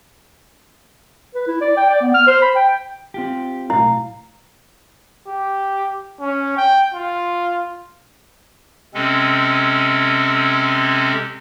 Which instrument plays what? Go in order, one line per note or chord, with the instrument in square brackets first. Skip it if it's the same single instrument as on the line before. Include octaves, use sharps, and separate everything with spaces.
[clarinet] B4
E4
D5
G5
D5
B3
F6
C5
B5
G5
[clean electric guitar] C4 F4 G4
[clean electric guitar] B1 A2 F5 [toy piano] E4
[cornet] G4
C#4
G5
F4
[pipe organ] C3 G#3 C4 C#4 A4